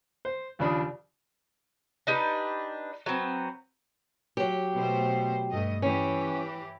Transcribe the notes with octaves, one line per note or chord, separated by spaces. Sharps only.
C5
D#2 C#3 F3 D4 B5 D#6
D4 D#4 G4 B4
F#3 B3 C4
F#3 G4
B2 A3 C5
G2 A3 D#5
E3 C#4 G4